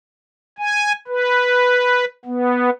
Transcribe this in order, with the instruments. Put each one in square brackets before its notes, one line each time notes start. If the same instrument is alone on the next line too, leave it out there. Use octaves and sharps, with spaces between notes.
[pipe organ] G#5
B4
B3